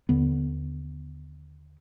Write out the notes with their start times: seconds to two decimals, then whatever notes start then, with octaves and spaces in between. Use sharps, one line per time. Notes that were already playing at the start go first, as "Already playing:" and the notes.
0.09 D#2 D3 B3